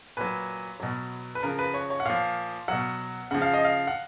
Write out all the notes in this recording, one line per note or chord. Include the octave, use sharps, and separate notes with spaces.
A#2 F#3 B4
B2 F#3
B4
C#3 F3 A#4
B4
C#5
C#5
F#5
A#2 F3 F5
B2 F#3 F#5
C#3 F3 F#5
F5
D#5
F5
F#5